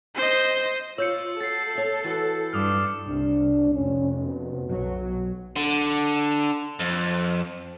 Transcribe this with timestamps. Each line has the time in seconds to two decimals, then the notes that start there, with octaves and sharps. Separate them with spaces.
0.16 C5 D#5
0.98 F4 C#5 E6 G6 C#7
1.41 F#4 A4 A6 C7
1.75 C#5 E5
2.04 E3 E4 F#4
2.53 G2 D6 D#6 F6
3.08 C2 D4
3.74 F1 C#4
4.21 B2
4.71 B1 F#3
5.56 D3
6.80 F2